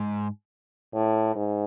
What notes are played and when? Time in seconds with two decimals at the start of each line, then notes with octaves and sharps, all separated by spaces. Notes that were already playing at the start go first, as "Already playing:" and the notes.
Already playing: G#2
0.94 A2
1.35 G#2